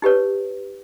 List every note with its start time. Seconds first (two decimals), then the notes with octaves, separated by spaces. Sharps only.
0.02 D#4 G4 B4 C#5